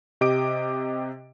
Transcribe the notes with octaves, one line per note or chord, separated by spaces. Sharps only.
C3 G4 D#5 D6 D7